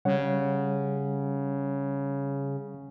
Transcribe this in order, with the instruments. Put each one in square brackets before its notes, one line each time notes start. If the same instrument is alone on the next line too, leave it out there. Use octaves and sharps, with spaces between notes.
[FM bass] C#3 [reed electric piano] G3 C#5 F#5